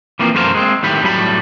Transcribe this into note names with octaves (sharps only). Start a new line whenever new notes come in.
E3 F3 A#3 C4
F#2 A3 A#4 C5 F5
G#3 C4
A2 D#3 G4 B5
A2 F#3 G3 B5